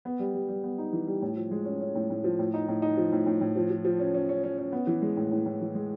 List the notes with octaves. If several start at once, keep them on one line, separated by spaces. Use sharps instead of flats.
B3
G3
G3
G3
B3
D#4
E3
G3
A2
F3
G#3
C#4
C#4
A2
A2
F3
A2
D#4
A2
D#4
F3
A2
A2
A2
F3
F3
F3
C#4
C#4
C#4
C#4
C#4
B3
E3
G#3
A2
A2
A2
E3
G#3